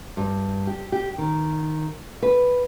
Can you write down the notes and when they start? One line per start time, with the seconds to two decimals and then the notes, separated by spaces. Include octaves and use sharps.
0.17 G2
0.67 G4
0.92 G4
1.18 D#3
2.23 B4